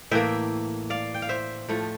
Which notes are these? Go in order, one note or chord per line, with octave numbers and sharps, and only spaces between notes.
A2 E3 A#3 E5 G5
D5 F5
G5
F5
C5 E5
A2 F3 A3